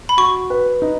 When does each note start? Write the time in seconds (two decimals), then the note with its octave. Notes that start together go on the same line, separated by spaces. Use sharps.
0.09 B5
0.17 F#4 C#6
0.50 B4
0.82 D#4